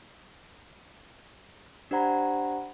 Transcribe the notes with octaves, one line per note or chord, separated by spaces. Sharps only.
D4 G4 C5 F#5 A#5 B5